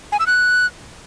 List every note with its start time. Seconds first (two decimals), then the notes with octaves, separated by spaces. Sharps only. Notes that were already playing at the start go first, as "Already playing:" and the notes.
0.12 G#5
0.19 E6
0.27 F#6